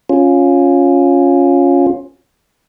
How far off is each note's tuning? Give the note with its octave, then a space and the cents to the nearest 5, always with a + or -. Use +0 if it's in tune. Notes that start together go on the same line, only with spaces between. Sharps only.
C#4 +0 F4 +15